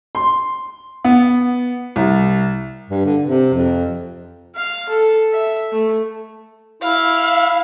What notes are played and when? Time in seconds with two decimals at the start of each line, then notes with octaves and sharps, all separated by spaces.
0.15 C6
1.05 B3
1.96 C2
2.91 G2
3.05 D3
3.23 C3
3.54 F2
4.56 F5
4.89 A4
5.33 E5
5.72 A3
6.83 E4 F5